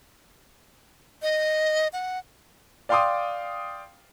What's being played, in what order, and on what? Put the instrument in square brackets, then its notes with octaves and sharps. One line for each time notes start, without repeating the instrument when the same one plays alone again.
[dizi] D#5
F#5
[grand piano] D5 F5 G5 C6 D6 D#6